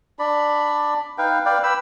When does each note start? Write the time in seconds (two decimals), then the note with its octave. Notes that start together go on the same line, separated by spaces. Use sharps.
0.19 D4 D5 B5
1.18 D#4 B4 F5 G5
1.45 B4 D5 F5 G5
1.63 B4 G5 B5 E6